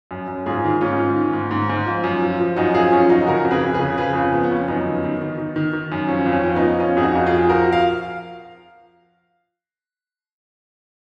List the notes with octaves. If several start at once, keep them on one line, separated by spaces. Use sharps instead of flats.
F#2
F#2
G#2 F4 G#4
D#3
G#2 C#4 F4
G#2
D#3
G#2
G#2
G#2
F3
F#2
F3
F3
F#2 D#4 F#4
F3 F4 G#4
F#2 C#4 F4
F3 D#4 F#4
C#3 F#4 A#4
F2
G#4 B4
F2
G#4 B4
C#3
F3 G#4 B4
F2 C#4
F2 B3
B3
F3 C#4
F#2 B3 D#4
D#3
D#3
D#3
D#3
D#3
D#3
F#2
F3 C#4
F2
C#4
F3
B3 D#4
F3
F3 C#4 F4
F2 G#4
D#4 F#4
F2
F4 G#4
F3
F3 F#4 A#4
F5